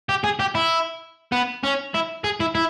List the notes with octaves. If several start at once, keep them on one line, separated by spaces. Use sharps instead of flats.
G4
G#4
G4
E4
B3
C#4
E4
G#4
E4
E4